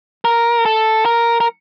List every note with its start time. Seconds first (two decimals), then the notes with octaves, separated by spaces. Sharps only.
0.25 A#4
0.65 A4
1.05 A#4
1.40 A#4